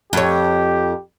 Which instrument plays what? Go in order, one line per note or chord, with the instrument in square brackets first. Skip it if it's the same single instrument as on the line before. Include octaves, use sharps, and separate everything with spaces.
[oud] F2 C#5 [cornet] G4